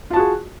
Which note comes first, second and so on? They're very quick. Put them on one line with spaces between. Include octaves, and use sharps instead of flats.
F4 A5 F#4 G#4